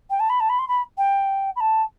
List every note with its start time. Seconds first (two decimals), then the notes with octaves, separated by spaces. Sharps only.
0.10 G5
0.19 A5
0.29 B5
0.40 A5
0.49 B5
0.58 C6
0.68 B5
0.97 G5
1.56 B5
1.60 A5